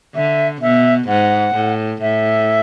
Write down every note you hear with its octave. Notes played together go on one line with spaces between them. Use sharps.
D3 E5
B2 E5
G#2 F#5
A2
A2 E5